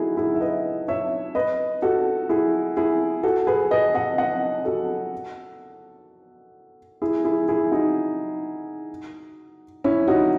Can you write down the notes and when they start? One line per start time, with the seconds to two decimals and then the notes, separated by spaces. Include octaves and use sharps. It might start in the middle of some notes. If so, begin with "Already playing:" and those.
Already playing: D#4 E4 F#4 G#4 A4
0.17 E4 G#4
0.35 E5
0.41 B4 D#5
0.88 C#5 E5
1.35 B4 D#5
1.82 F#4 A4
2.29 E4 G#4
2.77 E4 G#4
3.23 F#4 A4
3.47 G#4 B4
3.71 B4 D#5
3.94 D#5 F#5
4.18 D#5 F#5
4.65 F#4 A4
7.02 E4 G#4
7.24 E4 G#4
7.48 E4 G#4
7.71 D#4 F#4
9.84 C#4 E4
10.08 D#4 F#4